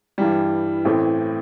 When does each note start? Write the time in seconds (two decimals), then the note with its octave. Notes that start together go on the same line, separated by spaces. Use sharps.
0.18 G2 E3 G3
0.85 A1 A2 E3 A3 C4